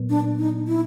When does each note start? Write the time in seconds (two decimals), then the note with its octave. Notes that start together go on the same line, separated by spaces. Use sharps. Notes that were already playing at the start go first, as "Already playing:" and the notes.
Already playing: A#2 F#3 B3
0.10 D4
0.39 D#4
0.67 E4